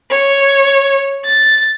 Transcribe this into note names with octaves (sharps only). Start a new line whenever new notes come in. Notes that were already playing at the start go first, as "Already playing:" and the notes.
C#5
A6